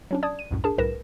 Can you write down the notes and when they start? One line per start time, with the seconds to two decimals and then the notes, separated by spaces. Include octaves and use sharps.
0.11 F#3 C#4 D4
0.23 D5 A5 D#6 G#6
0.39 D#7
0.51 C2 F#2 A2
0.64 D4 G#4 A#4 A5
0.78 C2 A2 A#4 B4 A#6 E7